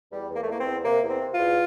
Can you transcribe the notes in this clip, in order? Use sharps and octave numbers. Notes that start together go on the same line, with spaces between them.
E2 G3
E2
A#3
A3
E2 A#3
C4
E2
C3 A#3
E2
C4
C3
F4
E2